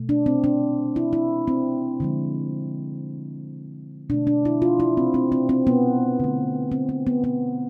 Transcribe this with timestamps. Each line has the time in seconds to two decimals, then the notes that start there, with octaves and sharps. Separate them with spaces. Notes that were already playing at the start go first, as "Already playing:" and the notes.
Already playing: B2 A3
0.09 D4
0.26 C4
0.44 D4
0.96 E4
1.13 E4
1.48 C4
2.00 D3 F3 G#3
4.10 B2 A3 D4
4.27 D4
4.45 E4
4.62 F4
4.80 E4
4.97 C4
5.14 C4
5.32 C4
5.49 C4
5.67 B3
6.20 D3 A3
6.72 C4
6.89 C4
7.07 B3
7.24 B3